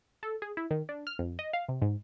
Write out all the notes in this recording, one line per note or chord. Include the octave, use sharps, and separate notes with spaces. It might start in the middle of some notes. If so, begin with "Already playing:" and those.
A4
G#4
E4
D#3
D4
F6
F2
D#5
F5
C3
G#2